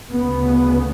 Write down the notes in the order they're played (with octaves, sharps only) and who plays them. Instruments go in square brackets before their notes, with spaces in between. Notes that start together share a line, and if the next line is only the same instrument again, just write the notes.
[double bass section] D2 C#3 B3